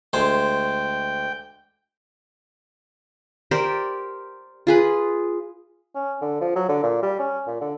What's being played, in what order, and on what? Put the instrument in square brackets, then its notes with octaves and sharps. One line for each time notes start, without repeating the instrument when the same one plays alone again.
[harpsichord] D2 G#3 C5 [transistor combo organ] G5
[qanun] G4 A#4 C5 D5
F4 G#4 B4
[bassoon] C#4
D3
F3
F#3
D3
A#2
G3
C#4
A#2
D3